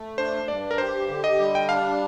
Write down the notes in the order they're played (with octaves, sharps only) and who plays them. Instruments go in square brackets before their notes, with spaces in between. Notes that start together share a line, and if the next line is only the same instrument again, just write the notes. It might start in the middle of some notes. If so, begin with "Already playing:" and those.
Already playing: [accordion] A3
[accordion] D4 [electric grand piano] C5
[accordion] G2 [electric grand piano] D5
[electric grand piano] A#4
[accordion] G4 [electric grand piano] C5
[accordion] D3
[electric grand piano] D#5
[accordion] G3
[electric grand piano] G5
[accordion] D4 [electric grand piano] F5